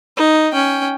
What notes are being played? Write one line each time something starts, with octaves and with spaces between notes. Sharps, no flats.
D#4
C#4 G5